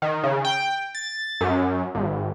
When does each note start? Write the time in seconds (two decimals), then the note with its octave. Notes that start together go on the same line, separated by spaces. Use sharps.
0.02 D#3
0.23 C#3
0.45 G5
0.95 A6
1.41 F#2
1.95 G#1